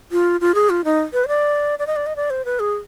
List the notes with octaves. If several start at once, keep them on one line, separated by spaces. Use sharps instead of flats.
F4
F4
G#4
F4
D#4
B4
C5
D5
D5
D#5
D5
D#5
D5
C5
B4
G#4